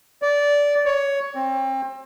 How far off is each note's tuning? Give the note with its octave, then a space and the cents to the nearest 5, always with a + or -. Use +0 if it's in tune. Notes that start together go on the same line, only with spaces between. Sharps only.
D5 -15
C#5 +10
C4 +30